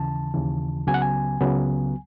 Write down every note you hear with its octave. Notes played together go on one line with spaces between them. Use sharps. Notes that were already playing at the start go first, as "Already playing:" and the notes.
Already playing: D#2 C#3 E3 A5
D#2 C#3 E3
C#2 C#3 F#3 B3 G#5
F#5
G#5
C#2 C#3 F#3 B3